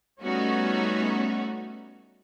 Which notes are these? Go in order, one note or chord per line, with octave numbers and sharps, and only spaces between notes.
G3 A3 B3 C#4 D#4 F#4